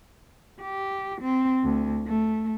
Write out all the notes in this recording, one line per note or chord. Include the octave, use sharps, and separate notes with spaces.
G4
C4
D2
A3